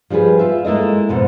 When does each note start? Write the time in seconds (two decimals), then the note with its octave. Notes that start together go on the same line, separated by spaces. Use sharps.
0.10 F3 G3 F#4 G#4 B4
0.39 F4 E5
0.65 G#3 A#3 E4 A4 D#5
1.09 F2 G#2 B2